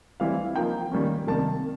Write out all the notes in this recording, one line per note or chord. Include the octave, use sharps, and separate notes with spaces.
E3 G3 C4 E4 F5
F3 A#3 D#4 G5
D#3 G3 A#3 C#4
C3 D#3 G3 A#3 A5